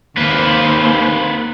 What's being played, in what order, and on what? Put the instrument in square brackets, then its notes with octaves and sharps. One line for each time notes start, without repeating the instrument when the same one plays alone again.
[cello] D#2 C5 [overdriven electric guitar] A#3 B4